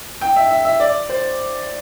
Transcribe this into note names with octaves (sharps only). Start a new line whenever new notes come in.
G5
E5
E5
E5
D5
C5